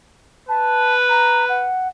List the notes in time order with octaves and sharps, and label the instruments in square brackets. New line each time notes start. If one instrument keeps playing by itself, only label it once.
[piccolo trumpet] B4 [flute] A5
[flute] A#5
F#5